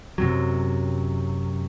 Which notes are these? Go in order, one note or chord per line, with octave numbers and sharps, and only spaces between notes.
F#2 C3 F#3